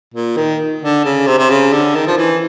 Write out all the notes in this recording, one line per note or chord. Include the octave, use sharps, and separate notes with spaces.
A#2
D#3
D3
C#3
C3
C3
C#3
D3
D#3
F3
E3